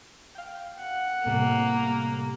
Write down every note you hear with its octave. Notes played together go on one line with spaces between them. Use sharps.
F5 G5
F#5
A2 C3 G3 A#3